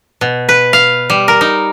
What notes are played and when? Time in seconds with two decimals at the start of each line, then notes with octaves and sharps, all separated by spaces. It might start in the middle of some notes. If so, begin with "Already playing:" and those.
0.21 B2
0.49 B4
0.73 F5
1.10 G3
1.28 A#4
1.41 D#4